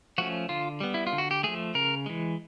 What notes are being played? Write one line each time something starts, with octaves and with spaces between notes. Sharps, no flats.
F3 A3 C#4 F#4
D3 F4
G3 B3
E4
F4
D3
F#4
G4
F3 A3 G#4
C#3 A#4
E3 G#3